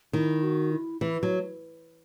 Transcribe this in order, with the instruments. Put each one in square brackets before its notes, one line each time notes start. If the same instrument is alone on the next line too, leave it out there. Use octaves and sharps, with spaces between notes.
[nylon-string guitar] D#3 [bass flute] E4
[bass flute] F#4
E4
[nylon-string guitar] E3 [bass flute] E4
[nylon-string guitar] F#3